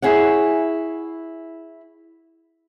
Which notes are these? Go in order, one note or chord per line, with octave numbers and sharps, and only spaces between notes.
E4 G#4 C#5 F#5